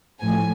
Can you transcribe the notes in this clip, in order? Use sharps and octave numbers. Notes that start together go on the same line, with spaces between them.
A2 F3 G#5